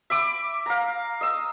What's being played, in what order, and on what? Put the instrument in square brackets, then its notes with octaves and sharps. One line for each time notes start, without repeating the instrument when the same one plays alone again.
[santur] E5 B5 D6
F5 A#5
D#5 E6